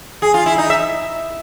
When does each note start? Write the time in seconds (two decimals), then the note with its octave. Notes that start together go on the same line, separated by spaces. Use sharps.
0.22 G#4
0.34 F4
0.46 E4
0.58 D#4
0.70 E5